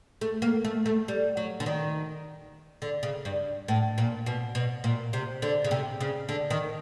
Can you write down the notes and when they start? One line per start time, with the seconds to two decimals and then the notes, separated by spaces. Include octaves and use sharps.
0.21 A3
0.42 A#3
0.65 A3
0.86 A3
1.08 G3
1.37 F#3
1.60 D3
1.66 D#3
2.82 D3
3.03 C#3
3.25 G2
3.68 A2
3.98 A#2
4.26 B2
4.55 B2
4.84 A#2
5.13 C3
5.42 D3
5.65 C#3
5.71 C3
6.01 C#3
6.29 D3
6.50 D#3